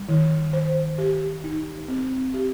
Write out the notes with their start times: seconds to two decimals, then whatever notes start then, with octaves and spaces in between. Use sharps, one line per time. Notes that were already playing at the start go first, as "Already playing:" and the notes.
Already playing: G3
0.09 D#3
0.53 C5
0.98 G4
1.44 D#4
1.88 C4
2.34 G4